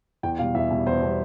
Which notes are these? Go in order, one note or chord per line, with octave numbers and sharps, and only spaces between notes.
E2 G5
B2 G3 F5
E2 E5
B2 G3
E2 C5
B2 G3